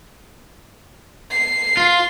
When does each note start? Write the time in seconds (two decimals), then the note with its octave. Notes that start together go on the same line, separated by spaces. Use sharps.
1.31 C7
1.77 F4